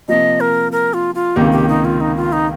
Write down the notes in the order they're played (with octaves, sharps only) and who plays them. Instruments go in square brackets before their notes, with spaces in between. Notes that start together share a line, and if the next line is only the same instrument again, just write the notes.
[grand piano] C3 F3 A#3 [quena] D#5
[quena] A#4
A#4
F4
F4
[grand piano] C#2 C3 D#3 A#3 [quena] G4
[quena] G4
D#4
F4
D#4
F4
D#4